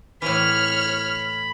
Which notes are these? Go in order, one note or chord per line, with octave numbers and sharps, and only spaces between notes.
A2 E3 C#5 B5 F6